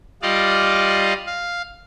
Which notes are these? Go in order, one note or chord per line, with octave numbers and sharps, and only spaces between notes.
G3 F4 D5 D#5 F5
F5